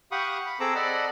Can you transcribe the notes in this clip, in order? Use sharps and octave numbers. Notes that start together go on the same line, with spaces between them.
G4 F5 F#5 B5 C#6 D#6
B5
C4 G#4 A4 A#5 D6 E6
A4 D5 D#5 F#5 B5